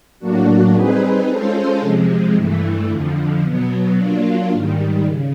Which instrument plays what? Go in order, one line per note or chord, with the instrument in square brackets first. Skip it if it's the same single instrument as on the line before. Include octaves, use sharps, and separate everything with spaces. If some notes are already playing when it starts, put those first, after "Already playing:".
[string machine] A2 F#3 A#3 D4 F#4
G3 C4 D#4 G#4 B4
G#3 C#4 F4 A4 C5
C3 F3 G#3
G2 E3 A3
F2 D3 F3
B2 F#3 B3
F#3 A#3 D4 F4
G#2 D#3 G3
C#3